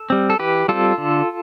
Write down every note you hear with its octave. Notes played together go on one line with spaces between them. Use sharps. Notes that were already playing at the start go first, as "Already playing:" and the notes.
Already playing: A4
G3 C4
A4
E3 G4 B4
G3 C4 F4 A4
D3